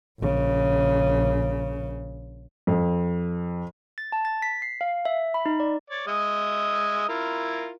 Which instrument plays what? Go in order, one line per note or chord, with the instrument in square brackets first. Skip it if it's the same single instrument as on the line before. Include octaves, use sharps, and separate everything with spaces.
[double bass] A#1 C#3
[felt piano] F2
[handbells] A6
A5
A6
B6
C7
F5
E5
B5
D#4
D5
[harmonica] C#5 D5
G#3 D#5 E5
E4 F4 A#4